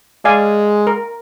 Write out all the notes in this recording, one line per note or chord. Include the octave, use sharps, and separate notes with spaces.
G#3 D5 F5 G#5
A#4